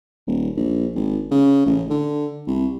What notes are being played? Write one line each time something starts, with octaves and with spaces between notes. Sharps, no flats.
D#1
A#1
G#1
C#3
A1
D3
C2